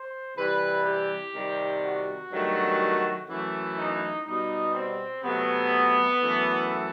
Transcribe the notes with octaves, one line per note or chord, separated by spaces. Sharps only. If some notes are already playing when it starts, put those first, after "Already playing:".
Already playing: C5
C3 E3 G3 B4
G4
C3 D#3 G3
F#4
G2 D#3 F#3 A3
F#2 E3 A3
D#4
B2 G3 D#4
C4
C3 F#3 A3 B3
F#2 E3 A3